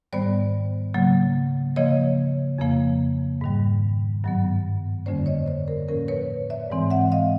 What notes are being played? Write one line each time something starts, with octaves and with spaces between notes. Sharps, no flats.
G#2 D#3 G3 B3 C5 D5
C#3 F#3 A#3
C#3 F3 A#3 C#5 D#5
F2 C#3 F3 A#3
G#2 D#3 G3
G2 D#3 F#3 B3
F2 D3 G3 A#3 C#4 C5 D5
C#5 D#5
C5 D5
A#4 C5
A2 F3 A#3 C#4 A#4 C5
B4 C#5
D5 E5
G#2 E3 G#3 C4
E5 F#5
D#5 F5